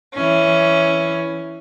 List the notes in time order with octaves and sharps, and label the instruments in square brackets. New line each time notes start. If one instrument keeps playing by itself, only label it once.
[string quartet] E3 C#4